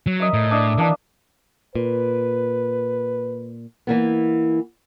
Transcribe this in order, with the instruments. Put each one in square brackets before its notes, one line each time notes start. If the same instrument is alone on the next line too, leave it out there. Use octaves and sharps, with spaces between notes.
[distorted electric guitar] F#3
[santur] A#4 D#5 E5
[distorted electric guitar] A2
[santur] D4 D#5 E5
[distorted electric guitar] E3 [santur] A#3 D4 A5
[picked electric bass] A#2 [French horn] B4
[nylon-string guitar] E3 A#3 B3